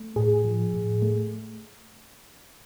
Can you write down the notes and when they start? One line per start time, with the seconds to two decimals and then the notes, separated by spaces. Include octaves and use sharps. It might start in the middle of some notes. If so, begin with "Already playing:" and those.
Already playing: A3
0.16 A2 G#4
0.45 F3
0.74 A2
1.02 A3